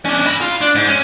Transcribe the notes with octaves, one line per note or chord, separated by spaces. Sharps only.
C#4 D4
D#5 B5
F4
D4
G#2
C#4